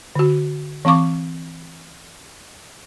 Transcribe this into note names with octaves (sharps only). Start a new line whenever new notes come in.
D3 F#4
E3 C4 F5 C#6 D6